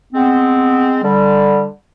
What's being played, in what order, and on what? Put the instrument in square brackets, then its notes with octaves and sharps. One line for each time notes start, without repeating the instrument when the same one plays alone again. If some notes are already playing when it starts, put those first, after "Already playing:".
[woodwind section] G#3 B3 C4
D3 G3